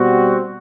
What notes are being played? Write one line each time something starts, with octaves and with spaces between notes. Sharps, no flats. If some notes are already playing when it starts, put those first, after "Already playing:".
Already playing: B2 G3 C4 F#4